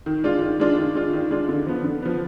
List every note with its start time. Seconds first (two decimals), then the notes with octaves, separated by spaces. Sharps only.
0.06 D#3
0.24 G#3 D4 F4
0.42 D#3
0.60 G#3 D4 F4
0.77 D#3
0.95 G#3 D4 F4
1.13 D#3
1.31 G#3 D4 F4
1.49 D3
1.67 F3 B3
1.84 D3
2.02 F3 B3